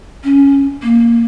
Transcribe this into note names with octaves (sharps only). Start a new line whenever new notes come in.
C#4
A#3